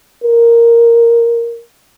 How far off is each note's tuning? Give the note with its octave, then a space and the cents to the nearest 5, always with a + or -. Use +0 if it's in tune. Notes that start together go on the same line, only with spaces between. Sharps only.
A#4 +0